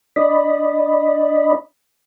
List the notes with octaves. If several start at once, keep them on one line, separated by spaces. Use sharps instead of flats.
D4 D5 D#5 B5